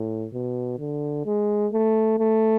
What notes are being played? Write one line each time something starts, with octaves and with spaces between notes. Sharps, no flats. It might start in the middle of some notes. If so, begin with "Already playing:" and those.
Already playing: A2
B2
D3
G#3
A3
A3